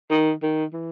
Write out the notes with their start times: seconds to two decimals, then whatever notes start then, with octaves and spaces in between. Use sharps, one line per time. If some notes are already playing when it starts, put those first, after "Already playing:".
0.10 D#3
0.42 D#3
0.73 E3